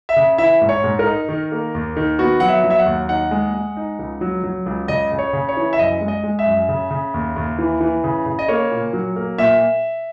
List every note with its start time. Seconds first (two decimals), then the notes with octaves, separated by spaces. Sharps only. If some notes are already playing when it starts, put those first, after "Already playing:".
0.09 E5
0.16 C#3
0.38 E3 E5
0.61 G#2
0.69 C#5
0.84 G#2
0.99 A#4
1.06 D#4
1.29 D#3
1.52 A#3
1.75 D#2
1.96 D#3
2.19 B3 F#4
2.40 F#3 F#5
2.48 E5
2.64 F#3
2.70 E5
2.79 F#5
2.86 D#2
3.09 D#4 F#5
3.31 G#3
3.54 G#3
3.77 D#4
3.99 C#2
4.21 F#3
4.44 F#3
4.66 C#2
4.88 C#3 D#5
5.11 C#3
5.19 C#5
5.33 C#3
5.49 C#5
5.57 E3
5.73 E5
5.79 F#2 D#5
6.01 G#3
6.08 D#5
6.24 G#3
6.39 E5
6.46 F#2
6.69 C#3
6.91 C#3
7.14 D#2
7.36 D#2
7.58 E3
7.81 E3
8.04 C#3
8.26 C#3
8.39 D#5
8.48 A#3 C#5
8.71 A#2
8.93 F#3
9.16 A#3
9.38 A#2 E5